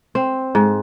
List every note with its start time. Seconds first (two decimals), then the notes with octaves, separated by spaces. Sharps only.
0.15 C4
0.55 G#2